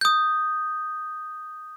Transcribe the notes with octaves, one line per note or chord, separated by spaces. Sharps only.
D#6 G6